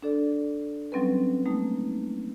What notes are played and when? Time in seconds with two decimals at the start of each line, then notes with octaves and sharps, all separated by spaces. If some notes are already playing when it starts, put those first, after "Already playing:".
0.02 D4 A4 D5
0.92 F#3 G3 C4 C#4 B4
1.45 G3 A3 A#3 D#4